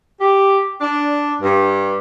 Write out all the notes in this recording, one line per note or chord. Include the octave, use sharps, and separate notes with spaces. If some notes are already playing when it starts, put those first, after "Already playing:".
G4
D4
G2